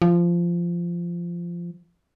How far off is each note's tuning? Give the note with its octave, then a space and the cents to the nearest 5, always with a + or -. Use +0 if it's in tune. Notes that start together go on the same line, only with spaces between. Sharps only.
F3 -15